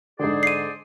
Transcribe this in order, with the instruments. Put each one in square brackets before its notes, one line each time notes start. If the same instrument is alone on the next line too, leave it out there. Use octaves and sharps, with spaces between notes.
[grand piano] G#2 D3 [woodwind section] G#4 C5 D5
[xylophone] C7 D#7